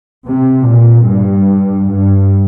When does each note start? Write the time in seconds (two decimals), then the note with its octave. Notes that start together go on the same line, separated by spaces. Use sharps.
0.26 C3
0.67 A#2
1.07 G2
1.88 G2